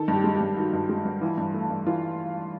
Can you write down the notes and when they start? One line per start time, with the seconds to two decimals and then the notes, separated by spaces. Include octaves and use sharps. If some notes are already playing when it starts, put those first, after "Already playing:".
Already playing: D#3 A4
0.08 G2
0.13 G4
0.24 G#3
0.35 G4
0.40 G2
0.57 D#3 F#4
0.73 G2
0.89 G#3
1.05 G2
1.21 E3 F4
1.38 G2
1.54 A3
1.70 G2
1.86 E3 F4